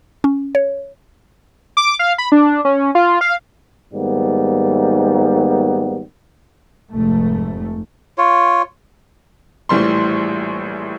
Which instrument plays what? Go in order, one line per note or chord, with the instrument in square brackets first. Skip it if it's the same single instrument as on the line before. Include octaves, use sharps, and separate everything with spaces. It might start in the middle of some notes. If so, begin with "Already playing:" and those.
[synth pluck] C#4
C#5
[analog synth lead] D6
F5
B5
D4
C#4
F4
F5
[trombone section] G#2 D#3 G3 A#3 B3
[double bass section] F1 G#2 A3
[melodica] F4 C#5
[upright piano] A#1 A2 E3 G3 C6